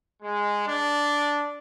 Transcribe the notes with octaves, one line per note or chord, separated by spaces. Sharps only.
G#3
D4